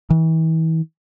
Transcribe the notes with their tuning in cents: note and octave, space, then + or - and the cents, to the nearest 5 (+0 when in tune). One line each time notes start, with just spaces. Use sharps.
E3 -40